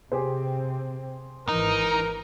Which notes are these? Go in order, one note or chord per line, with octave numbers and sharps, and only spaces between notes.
C3 C4 G4 G#4 C5
G#1 E3 D#4 A#4